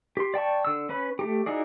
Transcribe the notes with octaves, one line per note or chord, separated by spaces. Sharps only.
G4 C6
D5 G5 A5 C#6
D3 E6
C#4 B4 B5
A3 D#4 G4
D#4 E4 F#4 G#4 D5